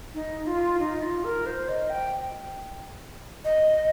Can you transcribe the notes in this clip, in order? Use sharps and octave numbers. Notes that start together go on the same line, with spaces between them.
D#4
F4
D#4
F4
A#4
C5
D#5
G5
D#5